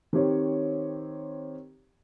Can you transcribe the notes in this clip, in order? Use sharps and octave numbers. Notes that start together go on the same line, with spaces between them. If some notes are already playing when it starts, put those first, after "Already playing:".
D#3 C4 G4 C#5